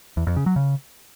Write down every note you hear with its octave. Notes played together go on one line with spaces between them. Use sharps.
E2
F2
C#3
F#3
C#3